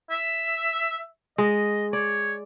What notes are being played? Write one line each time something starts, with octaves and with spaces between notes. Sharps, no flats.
E5
G#3 D#5
C#5 D5